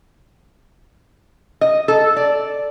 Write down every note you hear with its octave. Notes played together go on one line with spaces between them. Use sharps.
D#5
A4
D5